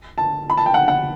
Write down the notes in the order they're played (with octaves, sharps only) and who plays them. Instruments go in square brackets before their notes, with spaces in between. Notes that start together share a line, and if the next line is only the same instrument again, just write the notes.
[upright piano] A5
B5
A5
G5
F#5
F#5